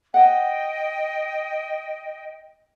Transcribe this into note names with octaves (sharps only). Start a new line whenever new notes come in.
D#5 F#5 G5